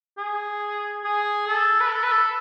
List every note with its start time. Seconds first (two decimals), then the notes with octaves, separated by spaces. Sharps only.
0.17 G#4
1.04 G#4
1.47 A4
1.81 B4
1.90 A4
2.03 B4
2.12 A4